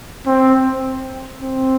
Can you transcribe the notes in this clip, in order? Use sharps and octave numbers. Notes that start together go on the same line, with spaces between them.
C4
C4